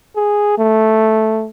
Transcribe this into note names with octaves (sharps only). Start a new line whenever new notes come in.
G#4
A3